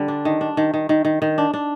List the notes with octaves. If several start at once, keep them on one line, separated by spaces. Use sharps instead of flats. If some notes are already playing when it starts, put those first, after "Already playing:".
Already playing: D3 G3
D4
D#3
D4
D#3
D#3
D#3
D#3
D#3
D4
D4